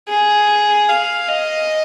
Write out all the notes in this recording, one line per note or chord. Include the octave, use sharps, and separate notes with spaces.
G#4
F5
D#5